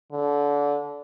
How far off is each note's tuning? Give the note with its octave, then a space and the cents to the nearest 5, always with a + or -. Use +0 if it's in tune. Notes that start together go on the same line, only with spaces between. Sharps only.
D3 -25